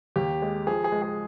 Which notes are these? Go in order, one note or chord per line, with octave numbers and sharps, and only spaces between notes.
D#2 G4
G#3
F3 G#4
G#4
G#3
G#4